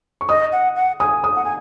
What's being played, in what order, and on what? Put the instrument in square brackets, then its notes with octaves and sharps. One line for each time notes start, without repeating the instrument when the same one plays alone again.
[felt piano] C#6
[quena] D#5 [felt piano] D#6
[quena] F#5
F#5
[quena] G#5 [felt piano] D#6
[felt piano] D#6
[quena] F#5
G#5